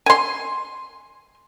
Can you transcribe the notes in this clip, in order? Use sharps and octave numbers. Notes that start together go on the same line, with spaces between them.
G#5 C6